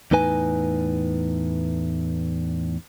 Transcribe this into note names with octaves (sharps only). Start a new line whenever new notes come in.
E2 A2 D#4 B4 G#5